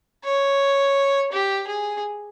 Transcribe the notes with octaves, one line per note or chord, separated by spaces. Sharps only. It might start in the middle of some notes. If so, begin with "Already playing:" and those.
C#5
G4
G#4